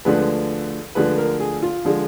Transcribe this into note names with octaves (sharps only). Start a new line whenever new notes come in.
D2 D3 F3 G#3 B4
D2 D3 F3 G#3 B4
A#4
G#4
F4
D3 F3 G#3